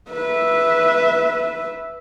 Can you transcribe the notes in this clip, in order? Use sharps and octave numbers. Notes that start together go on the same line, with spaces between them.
B4 E5